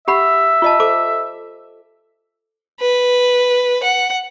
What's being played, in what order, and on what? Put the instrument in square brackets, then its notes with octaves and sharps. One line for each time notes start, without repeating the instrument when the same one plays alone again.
[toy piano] G4 F#5 B5 [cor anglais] E5
[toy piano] F4 D#5 A5
A4 C5 D6
[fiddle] B4
F#5